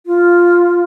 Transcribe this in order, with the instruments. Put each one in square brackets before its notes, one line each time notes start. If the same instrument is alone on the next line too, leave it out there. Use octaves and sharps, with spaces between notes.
[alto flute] F4